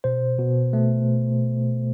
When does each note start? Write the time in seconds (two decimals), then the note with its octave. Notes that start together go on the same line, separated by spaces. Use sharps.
0.04 B2 C5
0.39 B2
0.73 A3